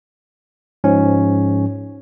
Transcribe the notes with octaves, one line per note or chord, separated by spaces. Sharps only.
G#2 F3 C#4